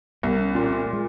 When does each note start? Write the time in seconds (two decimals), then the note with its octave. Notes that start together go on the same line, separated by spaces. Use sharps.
0.23 C2 B3
0.40 C#4
0.55 A#2 C#4
0.71 C4
0.86 A3
0.93 G#3